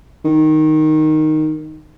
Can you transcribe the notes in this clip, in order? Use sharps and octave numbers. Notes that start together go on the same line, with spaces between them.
D#3